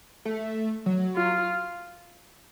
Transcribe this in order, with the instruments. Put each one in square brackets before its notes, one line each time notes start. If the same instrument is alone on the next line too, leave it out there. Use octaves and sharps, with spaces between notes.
[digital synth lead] A3
F#3
[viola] F4